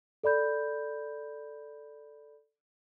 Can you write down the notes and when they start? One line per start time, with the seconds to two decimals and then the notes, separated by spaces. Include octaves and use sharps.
0.23 A4 D5 B5 G6